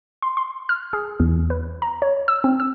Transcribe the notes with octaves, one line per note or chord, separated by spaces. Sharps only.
C6
C6
F6
G#4
E2
B4
A#5
C#5
E6
C4
E6